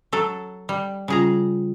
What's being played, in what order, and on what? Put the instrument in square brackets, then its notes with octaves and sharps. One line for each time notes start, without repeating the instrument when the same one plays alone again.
[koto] F#3 A4
G3
[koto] C#3 G#4 A#5 [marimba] G3 F4